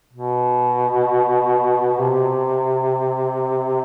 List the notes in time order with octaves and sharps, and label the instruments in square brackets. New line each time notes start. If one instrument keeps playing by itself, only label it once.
[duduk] B2
C3